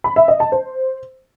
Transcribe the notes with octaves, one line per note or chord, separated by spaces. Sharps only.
B5
E5
D#5
A5
C5